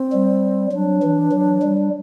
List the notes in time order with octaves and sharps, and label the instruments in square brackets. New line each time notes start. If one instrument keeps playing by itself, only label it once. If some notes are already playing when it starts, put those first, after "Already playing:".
Already playing: [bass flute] C4
[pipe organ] G3
[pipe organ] F#3 [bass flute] D4
[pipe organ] E3
F#3
G3